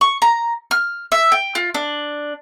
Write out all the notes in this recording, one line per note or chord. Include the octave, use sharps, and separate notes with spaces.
C#6
A#5
F6
E5
G5
F4
D4